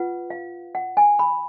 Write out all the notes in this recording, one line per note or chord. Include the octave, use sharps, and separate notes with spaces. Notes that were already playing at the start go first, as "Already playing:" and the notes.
Already playing: F4 B4 F#5
F5
F#5
G#5
B5